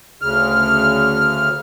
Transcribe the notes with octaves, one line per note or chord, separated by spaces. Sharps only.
D2 C#3 F6